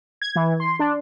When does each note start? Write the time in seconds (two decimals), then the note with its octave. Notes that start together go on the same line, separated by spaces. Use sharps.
0.22 G#6
0.36 E3
0.60 C6
0.79 D4